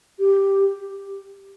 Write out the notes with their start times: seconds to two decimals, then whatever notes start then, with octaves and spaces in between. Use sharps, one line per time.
0.19 G4